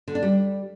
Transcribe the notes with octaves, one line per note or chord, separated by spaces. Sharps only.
D3
D4
G3